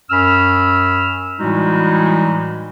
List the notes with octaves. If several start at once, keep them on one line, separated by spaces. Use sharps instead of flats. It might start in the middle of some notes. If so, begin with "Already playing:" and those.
F#2 C#4 B5 E6 F6
A2 E3 G3 G#3 D#4 F#4